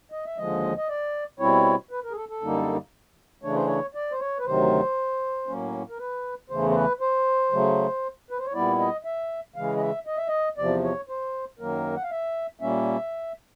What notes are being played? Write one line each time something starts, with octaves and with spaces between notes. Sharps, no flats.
D#5
E5
D#2 D3 F3 G#3 D#5
D#5
D5
B2 G3 C4 E4 C#5
B4
A#4
G#4
A4
A4
F#2 D3 G3 A#3 D#4
C#3 E3 A3 D4 C#5
C5
C#5
D5
C5
C#5
B4
D2 C3 D#3 F#3 C5
A2 F#3 A#3 C#4
A#4
B4
E2 C#3 E3 A3 C5
C5
B4
C5
C#3 F#3 A3
B4
C5
C#5
A#2 G3 B3 E4 D5
D#5
E5
C#3 E3 G#3 F5
D#5
E5
D#5
E5
D#5
E2 C3 F3 D5
C#5
C5
F#2 D#3 F#3 A#3 A#4
F#5
F5
E5
A#2 G3 A#3 C#4 E5